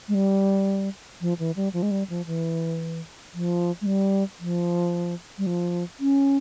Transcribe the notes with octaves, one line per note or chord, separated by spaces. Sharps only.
G#3
G3
F3
E3
G3
F3
G#3
G3
F3
E3
F3
G#3
G3
F3
G3
F3
C#4